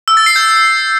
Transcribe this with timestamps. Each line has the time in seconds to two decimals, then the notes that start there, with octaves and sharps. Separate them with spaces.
0.08 E6
0.17 A6
0.26 C7
0.36 G6